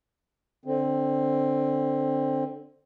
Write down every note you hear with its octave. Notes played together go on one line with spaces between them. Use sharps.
D3 C4